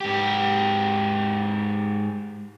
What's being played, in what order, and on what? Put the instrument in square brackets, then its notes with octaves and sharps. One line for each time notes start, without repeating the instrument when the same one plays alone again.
[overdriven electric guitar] G#2 G4